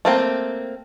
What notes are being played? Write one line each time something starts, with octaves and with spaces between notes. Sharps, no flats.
A3 A#3 C4